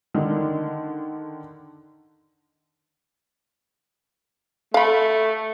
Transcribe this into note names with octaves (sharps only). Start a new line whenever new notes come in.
D3 D#3
A3 F5 B5